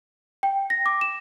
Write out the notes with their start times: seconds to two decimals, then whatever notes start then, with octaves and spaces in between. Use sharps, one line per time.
0.43 G5
0.70 A#6
0.86 D6
1.01 E7